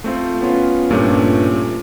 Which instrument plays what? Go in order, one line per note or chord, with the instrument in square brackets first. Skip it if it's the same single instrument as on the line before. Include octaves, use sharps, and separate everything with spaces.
[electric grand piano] A3 C4 F4
B3 C#4 F4
[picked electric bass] G2 [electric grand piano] A#2 A3 C#4